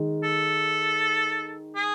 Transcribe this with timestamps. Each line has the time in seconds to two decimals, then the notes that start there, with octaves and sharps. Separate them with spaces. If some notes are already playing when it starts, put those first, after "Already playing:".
Already playing: D#3 G#3 D#4
0.23 A4
1.76 G#4